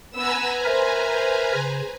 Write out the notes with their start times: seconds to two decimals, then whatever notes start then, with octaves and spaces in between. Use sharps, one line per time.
0.16 B3 B4 G#5 A#5 E6
0.65 A#4 C5 E5
1.54 C#3